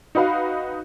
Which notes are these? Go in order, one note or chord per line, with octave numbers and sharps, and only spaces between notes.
D#4 F#4 B4 F5